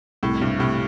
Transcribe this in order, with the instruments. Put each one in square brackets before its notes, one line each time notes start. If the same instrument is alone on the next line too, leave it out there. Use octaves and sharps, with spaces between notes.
[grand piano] C2 [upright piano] A2
[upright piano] G2 [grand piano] C3
[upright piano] A2 [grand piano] C3